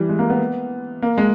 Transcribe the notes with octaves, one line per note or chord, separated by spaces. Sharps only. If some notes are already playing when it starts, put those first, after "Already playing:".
Already playing: E3 G3
G#3
A#3
B3
A#3
G#3